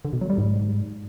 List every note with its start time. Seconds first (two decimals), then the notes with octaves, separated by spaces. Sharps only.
0.05 D3
0.13 B2
0.21 F#3
0.30 G3
0.38 G#2